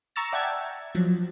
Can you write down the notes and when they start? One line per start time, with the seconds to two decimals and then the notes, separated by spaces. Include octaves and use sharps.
0.16 A#5 C#6 E6 A6
0.32 D5 E5 F#5 G5 A5 G#6
0.95 F3 F#3